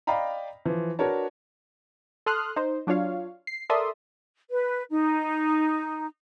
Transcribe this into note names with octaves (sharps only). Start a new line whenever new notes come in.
D5 D#5 F5 G5 A#5 B5
E3 F3
D4 F#4 A#4 B4 C#5 A5
A4 C6 D#6 F6 F#6
D#4 C5
F#3 D4 F4 C#5 F5
C7
A4 A#4 D5 E5 C6 D#6
B4
D#4